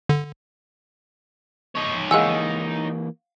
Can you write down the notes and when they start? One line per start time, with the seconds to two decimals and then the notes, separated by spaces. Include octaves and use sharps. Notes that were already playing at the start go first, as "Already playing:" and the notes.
0.09 D3
1.75 D#4 C#5
2.11 E3 G#3 A#3 F5 F#5 G#5 E6